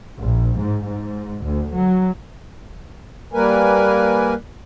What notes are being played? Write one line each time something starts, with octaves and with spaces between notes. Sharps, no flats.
A#1
G#2
G#2
D2
F#3
G3 A#3 A#4 B4 G#5